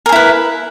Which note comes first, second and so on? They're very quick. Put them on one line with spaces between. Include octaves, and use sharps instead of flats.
A#4 G#4 E4 B4